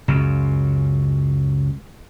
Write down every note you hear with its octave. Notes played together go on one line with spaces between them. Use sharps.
C#2 F#2